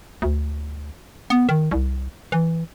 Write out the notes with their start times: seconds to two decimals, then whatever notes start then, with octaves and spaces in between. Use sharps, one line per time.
0.22 D2
1.30 B3
1.49 D#3
1.71 C2
2.32 E3